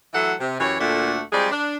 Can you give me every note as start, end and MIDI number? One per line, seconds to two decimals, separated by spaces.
0.13 0.33 52
0.13 0.33 54
0.13 0.33 57
0.13 0.33 69
0.13 0.33 76
0.13 0.33 78
0.40 0.59 48
0.59 0.76 42
0.59 0.76 52
0.59 0.76 67
0.59 0.76 73
0.79 1.21 38
0.79 1.21 46
0.79 1.21 50
0.79 1.21 57
0.79 1.21 62
0.79 1.21 78
1.31 1.51 53
1.31 1.51 55
1.31 1.51 56
1.31 1.51 60
1.31 1.51 68
1.31 1.51 74
1.51 1.77 62